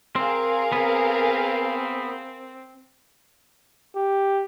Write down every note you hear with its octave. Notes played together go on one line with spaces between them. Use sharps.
C4 G#4 A#4 F5
B3 C4
G4